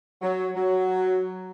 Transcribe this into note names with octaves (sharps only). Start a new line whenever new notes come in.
F#3
F#3